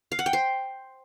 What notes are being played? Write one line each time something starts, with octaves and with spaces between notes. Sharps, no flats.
F5
F#5
G5
C5